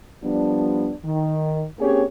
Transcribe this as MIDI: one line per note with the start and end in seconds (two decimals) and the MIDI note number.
0.22 0.91 53
0.22 0.91 55
0.22 0.91 59
0.22 0.91 62
1.04 1.63 51
1.78 2.04 58
1.78 2.04 60
1.78 2.04 61
1.78 2.04 67
1.78 2.04 68
1.78 2.04 73